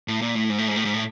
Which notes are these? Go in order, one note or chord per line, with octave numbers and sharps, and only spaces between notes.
A2
A#2
A2
G#2
A2
G#2
A2
G#2
A2